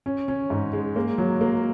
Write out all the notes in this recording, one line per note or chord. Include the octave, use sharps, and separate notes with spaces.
C#4
C#4
G#2
G#3
A#3
F#3
A#3